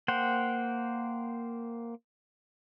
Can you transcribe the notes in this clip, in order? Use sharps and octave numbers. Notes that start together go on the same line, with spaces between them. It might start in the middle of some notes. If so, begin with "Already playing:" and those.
A#3 C5 F#5 G5